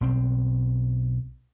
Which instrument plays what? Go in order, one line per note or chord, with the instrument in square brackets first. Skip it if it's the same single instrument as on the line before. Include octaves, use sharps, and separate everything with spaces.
[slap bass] B1 C4